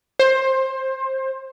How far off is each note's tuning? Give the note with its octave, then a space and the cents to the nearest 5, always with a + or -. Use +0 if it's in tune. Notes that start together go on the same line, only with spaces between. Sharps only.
C5 +20